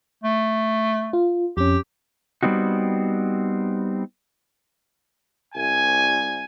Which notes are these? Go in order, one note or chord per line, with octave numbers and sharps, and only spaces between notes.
A3
F4
F2 C#4 G4
G3 B3 C4 D#4 F#4
C2 G#5